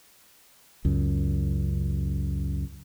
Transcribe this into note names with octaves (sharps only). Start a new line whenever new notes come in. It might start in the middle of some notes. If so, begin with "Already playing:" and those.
C#2 F#2